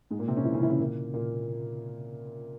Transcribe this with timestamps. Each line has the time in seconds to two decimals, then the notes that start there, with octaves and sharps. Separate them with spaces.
0.11 G#2 G#3
0.19 A#2 A#3
0.28 C3 C4
0.36 C#3 C#4
0.45 E3 E4
0.54 C#3 C#4
0.62 E3 E4
0.70 C#3 C#4
0.79 A#2 A#3
1.14 A#2 A#3